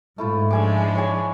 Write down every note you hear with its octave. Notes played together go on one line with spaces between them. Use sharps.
G#2 A3 E4 F4
F3 G#3 D4 E5 G#5 D6
C#5 G#5